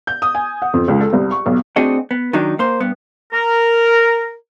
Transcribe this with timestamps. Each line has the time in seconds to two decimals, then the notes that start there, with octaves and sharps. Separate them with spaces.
0.07 G6
0.22 D#6
0.35 G#5
0.62 F#5
0.73 F2
0.88 C#2
1.00 A4
1.13 C2
1.31 C#6
1.46 B1
1.76 A3 C4 D4 F#4 G#4 D#5
2.11 B3
2.33 D#3 F#3 D4 D#4
2.59 A#3 C5
2.80 G2 B3
3.33 A#4